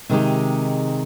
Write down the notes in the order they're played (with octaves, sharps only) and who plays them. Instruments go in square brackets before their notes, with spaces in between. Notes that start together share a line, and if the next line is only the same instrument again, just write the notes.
[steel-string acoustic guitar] C3 D#3 G#3 D#4 G4